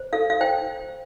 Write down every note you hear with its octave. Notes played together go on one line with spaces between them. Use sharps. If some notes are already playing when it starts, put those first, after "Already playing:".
Already playing: C5
A4 F5
F5
C5 G5